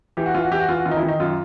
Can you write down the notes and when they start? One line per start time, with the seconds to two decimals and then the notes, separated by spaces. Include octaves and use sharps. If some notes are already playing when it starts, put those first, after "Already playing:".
0.17 E3 G4
0.26 F#4
0.34 E3 F4
0.43 F#4
0.51 E3 G4
0.60 F#4
0.69 E3 F4
0.77 F#4
0.85 D#3 F4
0.91 D#4
0.97 E4
1.03 D#3
1.08 D#4
1.20 F#2 F4